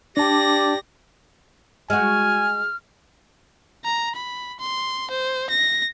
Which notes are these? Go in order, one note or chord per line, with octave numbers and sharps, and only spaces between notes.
D4 G4 D5 A5 A#6
G#3 F#4 G#5 F6
A#5
B5
C6
C5
A#6